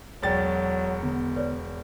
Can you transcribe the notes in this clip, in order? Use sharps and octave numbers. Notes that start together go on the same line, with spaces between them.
E1 F#3 C5 D5 G5 A6
D3 B3
B4 C#5 D5